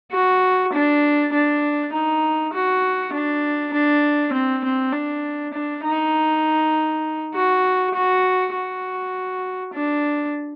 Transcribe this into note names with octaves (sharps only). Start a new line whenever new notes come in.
F#4
D4
D4
D#4
F#4
D4
D4
C4
C4
D4
D4
D#4
F#4
F#4
F#4
D4